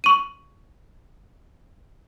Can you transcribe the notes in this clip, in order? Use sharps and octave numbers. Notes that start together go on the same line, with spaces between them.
C#6 D#7